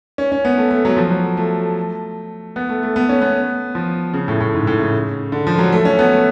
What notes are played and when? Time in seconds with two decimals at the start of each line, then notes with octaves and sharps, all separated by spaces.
0.18 C#4
0.32 C#4
0.45 B3
0.57 A3
0.71 A3
0.85 F#3
0.97 F3
1.10 F#3
1.37 A3
2.56 B3
2.69 A3
2.83 A3
2.96 B3
3.09 C#4
3.22 B3
3.75 F3
4.13 C#3
4.28 A2
4.40 A2
4.54 G#2
4.67 A2
4.80 C#3
5.32 D3
5.47 F3
5.59 F#3
5.72 A3
5.85 C#4
5.99 B3
6.12 A3